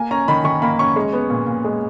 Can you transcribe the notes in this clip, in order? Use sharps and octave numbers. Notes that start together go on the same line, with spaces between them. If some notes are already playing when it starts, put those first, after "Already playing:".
Already playing: A#3 G#5
C#4 A#5
D#3 B5
D#3 C#6
A#3 B5
C#4 C#6
G#3
B3
A#2
A#2
G#3